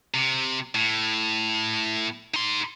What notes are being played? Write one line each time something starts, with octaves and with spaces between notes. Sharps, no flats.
C3
A2
D#4 C6